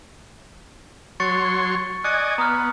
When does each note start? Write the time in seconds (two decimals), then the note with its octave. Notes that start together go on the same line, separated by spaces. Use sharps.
1.20 F#3 C#5 C6 C#6 A6 C#7
2.04 D5 D#5 G#5 F#6 C#7
2.38 B3 A#5 D#6 F6